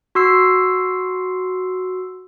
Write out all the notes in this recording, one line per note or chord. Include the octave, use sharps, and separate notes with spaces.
F#4 C6 E6 C7